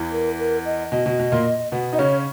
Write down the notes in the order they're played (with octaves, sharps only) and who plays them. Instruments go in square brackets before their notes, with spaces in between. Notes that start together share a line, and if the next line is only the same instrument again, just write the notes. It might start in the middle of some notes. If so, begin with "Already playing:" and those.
Already playing: [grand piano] E2 E3
[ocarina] A#4
A#4
D#5
[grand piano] B2 [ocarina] D#5
[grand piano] B2
B2
A#2 A#3
B2 B3
[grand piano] D#4 [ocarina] D#5
[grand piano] C#3 C#4 [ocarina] C#5